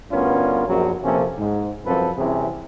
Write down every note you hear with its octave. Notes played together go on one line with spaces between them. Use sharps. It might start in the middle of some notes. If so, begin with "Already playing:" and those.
D2 G2 B3 C#4 F4 A#4
A#1 F#2 F#3
A#1 C3 F3 A#3 C#4 A4
G#2
C2 F#2 F3 C4 A4 B4
C2 C3 E3 C4 C#4 G#4